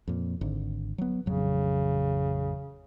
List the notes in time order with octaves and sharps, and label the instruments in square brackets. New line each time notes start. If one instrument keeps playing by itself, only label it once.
[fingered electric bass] F2 A#2
G#1 D3
F#3 B3
[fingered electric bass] A1 F2 F#3 [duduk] C#3